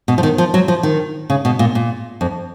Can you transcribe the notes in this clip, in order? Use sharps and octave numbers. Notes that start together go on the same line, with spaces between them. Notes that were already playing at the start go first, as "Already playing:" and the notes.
B2
F3
D#3
F3
F#3
F3
D#3
C#3
B2
A#2
A#2
F2